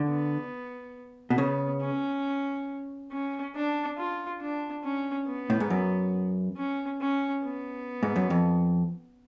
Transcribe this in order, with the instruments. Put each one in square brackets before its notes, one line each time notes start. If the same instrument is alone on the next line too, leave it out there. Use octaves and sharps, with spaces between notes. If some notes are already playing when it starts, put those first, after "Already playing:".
Already playing: [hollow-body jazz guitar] D3
[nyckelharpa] B3
[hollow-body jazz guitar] B2
[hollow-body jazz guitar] C#3 [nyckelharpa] B3
[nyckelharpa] C#4
C#4
D4
F4
D4
C#4
B3
[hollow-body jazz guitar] A2
G#2
F#2
[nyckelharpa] C#4
C#4
B3
[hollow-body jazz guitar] G#2
F#2
F2